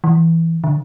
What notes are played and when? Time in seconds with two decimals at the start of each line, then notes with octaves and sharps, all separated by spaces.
0.04 E3
0.64 D3